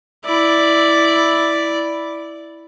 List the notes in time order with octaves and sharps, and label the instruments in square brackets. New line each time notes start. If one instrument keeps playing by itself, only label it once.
[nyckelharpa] E4 D5